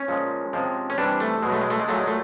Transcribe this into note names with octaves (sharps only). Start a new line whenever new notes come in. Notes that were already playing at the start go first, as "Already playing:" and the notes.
Already playing: C#4
A#2 F3 G#3
C3 F3 G#3
C#4
C3 E3 G3 D4
A3
B2 F#3 G#3
A3
G#3
A3
G#3
A#2 F#3 A3
G#3
A3